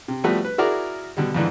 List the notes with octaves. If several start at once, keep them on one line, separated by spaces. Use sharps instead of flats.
C3
F3 G3 A3 B3 F#4 B4
B4
E4 F#4 G#4 A#4 D5
B2 D3 G3
F2 G#2 D3 E3